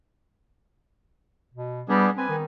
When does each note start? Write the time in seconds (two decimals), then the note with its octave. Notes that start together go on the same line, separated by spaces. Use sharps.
1.54 B2
1.89 G3 B3 D4 G#4
2.18 C4 B4 G#5
2.29 D#3